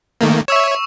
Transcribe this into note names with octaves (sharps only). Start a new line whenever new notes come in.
D#3 A3 A#3
C#5 E5 C#6 E6 E7